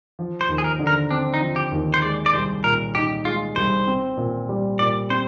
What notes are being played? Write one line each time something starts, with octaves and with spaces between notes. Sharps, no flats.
F3
C5
D#2
G#4
A#4
D3
A#4
C4 D4
D#4
F3
G4
D#2
C5
G#3 D5
D5
C2 C5
A#2 A#4
D#4 G4
G#3 F4
C2 C5
C4
A#2
G3
A#2 D5
C4 C5